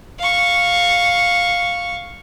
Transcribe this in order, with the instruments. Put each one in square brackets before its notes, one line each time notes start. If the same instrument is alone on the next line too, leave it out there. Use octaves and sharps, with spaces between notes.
[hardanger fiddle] F5 C#6